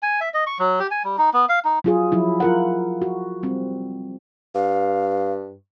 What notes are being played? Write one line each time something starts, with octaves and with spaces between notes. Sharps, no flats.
G#5
E5
D#5
C#6
F#3
G4
G#5
G3
D#4
B3
F5
D#4
F#3 F4 G#4
F3 F#3 E4
F4 A#4 F#5
F#4
G3 C4
G2 F5